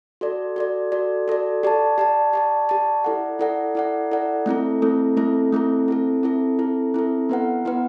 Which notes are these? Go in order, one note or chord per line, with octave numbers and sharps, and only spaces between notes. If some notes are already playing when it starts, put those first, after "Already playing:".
F#4 A4 D5
F#4 A4 D5
F#4 A4 D5
F#4 A4 D5
G4 D5 A5
G4 D5 A5
G4 D5 A5
G4 D5 A5
E4 A4 D5 F#5
E4 A4 D5 F#5
E4 A4 D5 F#5
E4 A4 D5 F#5
A3 C4 E4 A4
A3 C4 E4 A4
A3 C4 E4 A4
A3 C4 E4 A4
C4 E4 A4
C4 E4 A4
C4 E4 A4
C4 E4 A4
B3 E4 B4 F#5
B3 E4 B4 F#5